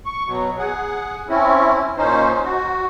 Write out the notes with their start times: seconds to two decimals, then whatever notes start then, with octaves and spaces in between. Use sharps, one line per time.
0.06 C#6
0.27 B2 F#3
0.58 G#4 F#5
1.28 C4 C#4 E4
1.97 A#2 C#4 D#4 C5
2.44 F#4